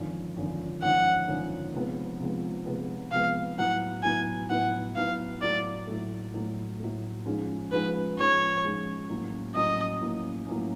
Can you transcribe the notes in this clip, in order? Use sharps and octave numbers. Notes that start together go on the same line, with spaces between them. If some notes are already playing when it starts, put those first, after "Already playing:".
Already playing: G#1 F#2 D3 F3
G#1 F#2 D3 F3
G#1 F#2 D3 F3 F#5
G#1 F#2 D3 F3
C3 F3 G#3 B3
C3 F3 G#3 B3
C3 F3 G#3 B3
C3 F3 G#3 B3 F5
A2 F#3 B3 E4 F#5
A2 F#3 B3 E4 G#5
A2 F#3 B3 E4 F#5
A2 F#3 B3 E4 F5
A2 F#3 A3 D5
A2 F#3 A3
A2 F#3 A3
A2 F#3 A3
G#2 F3 G#3 C#4
G#2 F3 G#3 C#4 B4
G#2 F3 G#3 C#4 C#5
G#2 F3 G#3 C#4
A2 F#3 A#3 C#4
A2 F#3 A#3 C#4 D#5
A2 F#3 A#3 C#4
A2 F#3 A#3 C#4